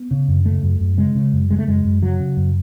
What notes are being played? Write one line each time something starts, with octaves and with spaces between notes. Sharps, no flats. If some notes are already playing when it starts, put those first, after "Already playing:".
Already playing: B3
C#3
F#2
C#3 A3
F#2
F#2
C#3 G#3
C#3
F#2
C#3 G#3
A3
F#2 G#3
F#2
C#3 F#3
C#3
F#2